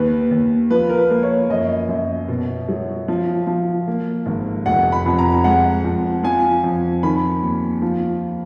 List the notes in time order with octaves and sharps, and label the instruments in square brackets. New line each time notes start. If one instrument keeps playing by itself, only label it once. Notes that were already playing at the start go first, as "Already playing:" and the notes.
Already playing: [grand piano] D#2 B4
D#2
F3 B4
A#4
B4
A#3
C#5
F#2 D#5
F#2
B2
F#3
F3
F3
A#3
G#1
F1 F#5
B5
F2
A#5
G#3 F#5
F2
F3 G#5
F2
D#3 B5
D#2
F3